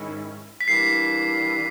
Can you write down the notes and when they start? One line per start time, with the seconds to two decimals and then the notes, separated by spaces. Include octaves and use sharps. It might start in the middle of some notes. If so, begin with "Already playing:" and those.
Already playing: G#2 D#3 G#3 C#4 E4
0.61 B6
0.68 E3 G3 A#3 D4 C7